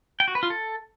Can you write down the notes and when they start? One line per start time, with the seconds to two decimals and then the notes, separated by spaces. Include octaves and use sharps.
0.20 G5
0.28 F#4
0.35 B4
0.43 F4
0.50 A4